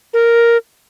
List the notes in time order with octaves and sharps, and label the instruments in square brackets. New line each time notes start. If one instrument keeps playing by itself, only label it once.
[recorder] A#4